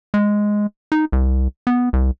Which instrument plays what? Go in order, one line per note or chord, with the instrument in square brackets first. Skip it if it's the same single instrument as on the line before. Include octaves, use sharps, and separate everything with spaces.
[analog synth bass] G#3
D#4
C2
B3
C2